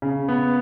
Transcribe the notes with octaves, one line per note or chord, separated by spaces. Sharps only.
C#3
B3